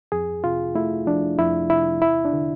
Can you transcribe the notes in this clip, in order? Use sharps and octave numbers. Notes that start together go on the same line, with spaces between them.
F2 G#4
C3 F4
A3 E4
F3 D4
F2 E4
C3 E4
E2 E4
D4
D3